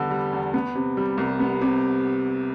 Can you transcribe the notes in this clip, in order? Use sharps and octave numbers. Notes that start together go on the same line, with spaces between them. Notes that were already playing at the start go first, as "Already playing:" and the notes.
Already playing: E2 D3 G3 B3
G3
E2
B3
C3
G3
C2
B3
C3